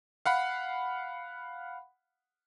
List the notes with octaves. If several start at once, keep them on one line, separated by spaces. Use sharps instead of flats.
F5 F#5 B5